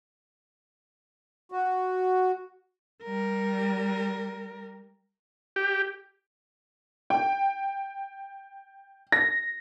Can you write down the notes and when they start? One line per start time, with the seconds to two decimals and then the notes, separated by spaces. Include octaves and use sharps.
1.52 F#4
3.04 G3 A#4
5.56 G4
7.10 G5
9.12 A#6